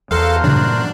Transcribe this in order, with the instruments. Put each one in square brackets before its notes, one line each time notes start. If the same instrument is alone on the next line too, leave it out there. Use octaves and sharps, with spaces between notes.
[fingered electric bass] E2 [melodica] F#4 A#4 C5 [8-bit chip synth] A4 F5
[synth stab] G2 C#3 [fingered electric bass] A#2 E3 F#3 [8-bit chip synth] D4